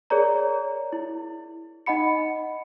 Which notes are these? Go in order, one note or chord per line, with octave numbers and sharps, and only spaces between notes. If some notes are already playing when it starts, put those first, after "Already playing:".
G#4 A#4 C#5 D5 A#5
E4
D#4 D#5 F#5 B5 C#7